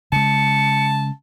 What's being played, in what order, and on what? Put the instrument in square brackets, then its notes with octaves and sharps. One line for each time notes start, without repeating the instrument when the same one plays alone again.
[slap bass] C#3 G#3 [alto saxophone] A5 [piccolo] C#7